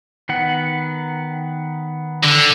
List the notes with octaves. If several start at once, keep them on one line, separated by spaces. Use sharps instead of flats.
D#3 B3 F#5
D3